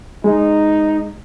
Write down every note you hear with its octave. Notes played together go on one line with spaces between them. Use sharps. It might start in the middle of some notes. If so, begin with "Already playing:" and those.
G#3 D#4